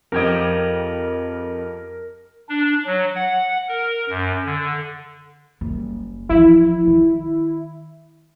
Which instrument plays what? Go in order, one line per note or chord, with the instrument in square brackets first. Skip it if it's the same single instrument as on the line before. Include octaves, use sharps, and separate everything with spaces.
[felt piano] F2 G#6 [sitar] F3 G4 D#5 [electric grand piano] A#4
[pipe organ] D4
F#3
F#5
A#4
F#2
D3
[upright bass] F#1 G3
[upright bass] E3 F3 [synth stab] E4
[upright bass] D#3